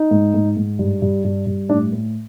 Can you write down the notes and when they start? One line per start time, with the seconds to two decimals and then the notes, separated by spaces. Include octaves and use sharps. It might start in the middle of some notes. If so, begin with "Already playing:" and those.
Already playing: D#4
0.11 G#2
0.34 G#2
0.57 G#2
0.79 G2
1.02 G2
1.24 G2
1.46 G2
1.69 A2 D4
1.92 A2